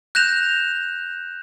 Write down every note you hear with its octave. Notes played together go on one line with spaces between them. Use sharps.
F#6 G6 A#6 E7 F7